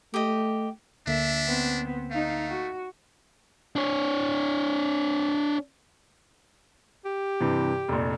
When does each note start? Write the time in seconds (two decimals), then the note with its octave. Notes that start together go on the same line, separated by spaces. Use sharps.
0.14 A3 G4 D#5
1.07 D2 D3 A#3 D4 E5
1.46 B3 C4
2.11 A3 D#4 F5
2.48 F#4
3.76 D4 C#5
7.05 G4
7.40 G2 C3 E3
7.88 F1 A#1